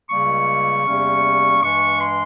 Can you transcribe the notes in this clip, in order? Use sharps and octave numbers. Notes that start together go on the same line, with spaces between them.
C#2 C#3 G3 A#3 C#6
E2 C3 G3 A#3 C#4
G2 E3 G#3 C#6
C6